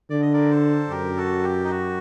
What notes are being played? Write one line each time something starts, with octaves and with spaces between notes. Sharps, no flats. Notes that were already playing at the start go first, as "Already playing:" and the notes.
D3 D5
D#5
A#4 D5
A4 C5
F#2 G4 A#4
F#4 A4
G4
D#4
F#4